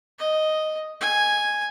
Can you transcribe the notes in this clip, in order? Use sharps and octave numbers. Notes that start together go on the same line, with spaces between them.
D#5
G#5